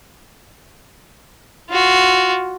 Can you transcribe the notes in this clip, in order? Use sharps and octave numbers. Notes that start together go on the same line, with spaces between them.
F4 F#4